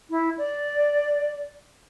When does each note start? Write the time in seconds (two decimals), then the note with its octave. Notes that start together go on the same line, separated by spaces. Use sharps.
0.10 E4
0.37 D5